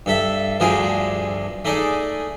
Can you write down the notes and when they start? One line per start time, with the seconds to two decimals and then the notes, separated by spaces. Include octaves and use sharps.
0.06 G2 A4 E5
0.60 D2 G2 D3 F3 G#4 A#4
1.65 A3 D#4 G#4 D5